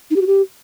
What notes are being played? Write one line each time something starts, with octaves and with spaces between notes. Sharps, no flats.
D#4
G4
F#4
G4